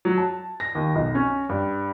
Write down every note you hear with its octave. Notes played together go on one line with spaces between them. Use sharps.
F#3
A5
A#6
D#2
B1
C#4
G2